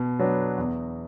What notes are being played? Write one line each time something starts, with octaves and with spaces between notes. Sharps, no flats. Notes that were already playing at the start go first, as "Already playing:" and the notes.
Already playing: B2
F#3 B3 D4
E2